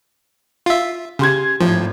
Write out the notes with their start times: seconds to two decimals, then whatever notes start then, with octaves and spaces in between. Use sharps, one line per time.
0.66 F4 E5
1.19 C#3 G4 C6 G#6
1.60 G#1 A2 F3